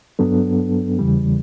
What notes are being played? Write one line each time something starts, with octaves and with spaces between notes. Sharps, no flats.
G2 F#3 B3 D4 A4
E2 C#3 E3 G3